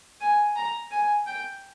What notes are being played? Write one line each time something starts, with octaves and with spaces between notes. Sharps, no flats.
G#5
A#5
G#5
G5